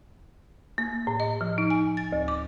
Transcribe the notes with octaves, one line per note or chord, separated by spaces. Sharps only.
A#3
A2
D#5
F3
D#4
G#5
A6
D2
D6